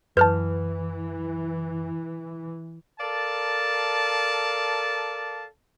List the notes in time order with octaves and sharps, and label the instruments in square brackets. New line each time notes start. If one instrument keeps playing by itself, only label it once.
[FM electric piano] F#2 [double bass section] E3 [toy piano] B4 [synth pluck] A5 F6 G6
[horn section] A4 A#4 D5 F5 A5